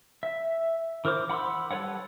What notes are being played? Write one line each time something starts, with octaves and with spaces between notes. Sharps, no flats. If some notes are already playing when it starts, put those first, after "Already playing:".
E5
E3 A#4 C5 D6
F#5 B5 C6 D6 E6
G3 A4 B4 C#5 F#5